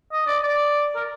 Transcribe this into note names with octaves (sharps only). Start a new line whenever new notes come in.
D#5
D5
D5
A#4